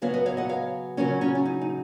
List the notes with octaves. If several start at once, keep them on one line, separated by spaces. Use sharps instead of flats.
C#3 F#3 B3 C#5 F5
B4 D#5
C#5 F5
D#5 F#5
C#5 F5
C#3 F#3 C#4 A#4 C#5
C#4 F4
C#4
D#4
D#4